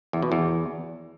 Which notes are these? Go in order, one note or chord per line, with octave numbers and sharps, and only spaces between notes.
E2
B2
E2